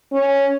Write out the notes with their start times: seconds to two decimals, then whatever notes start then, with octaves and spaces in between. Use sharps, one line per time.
0.12 C#4